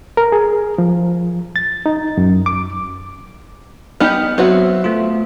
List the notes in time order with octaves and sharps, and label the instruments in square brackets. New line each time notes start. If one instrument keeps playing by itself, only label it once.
[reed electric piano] A#4
G#4
F3
A6
D#4
F#2
D6
[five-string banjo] B3 D#4 G4 [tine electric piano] F6
[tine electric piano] F#3 E5 [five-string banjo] B3 C4 F#4
[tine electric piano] A3 F4